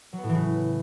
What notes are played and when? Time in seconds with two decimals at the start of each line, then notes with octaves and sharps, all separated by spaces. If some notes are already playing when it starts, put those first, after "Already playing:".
0.13 F#3
0.18 B3
0.23 A2
0.29 E3
0.34 C#3